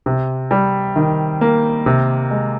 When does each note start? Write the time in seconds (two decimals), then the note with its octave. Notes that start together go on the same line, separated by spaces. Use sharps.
0.06 C3
0.51 G3
0.96 D#3
1.41 A#3
1.86 C3
2.31 G#3